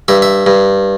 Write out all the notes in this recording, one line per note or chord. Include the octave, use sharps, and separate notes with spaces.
G2 E5
E5
G2